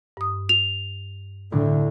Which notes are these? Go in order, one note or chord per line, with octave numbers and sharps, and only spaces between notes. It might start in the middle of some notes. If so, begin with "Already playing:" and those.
G2 D#6
F7
D2 A2 D3